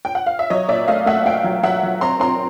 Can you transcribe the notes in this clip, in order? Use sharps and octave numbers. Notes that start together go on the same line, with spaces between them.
G5
F#5
F5
E5
F#3 C#5 D#5
A#2 D5 E5
A3 D#5 F5
A3 E5 F#5
A3 F5 G5
F#3
F#3 E5 F#5
F#3
C4 A#5 C6
C4 A#5 C6